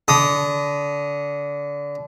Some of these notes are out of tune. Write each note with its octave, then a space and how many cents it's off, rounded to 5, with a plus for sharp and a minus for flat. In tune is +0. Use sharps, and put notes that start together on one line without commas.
D3 -25 D#6 +0